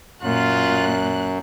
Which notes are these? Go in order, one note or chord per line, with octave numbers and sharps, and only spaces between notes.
F#2 A#2 F4 F#6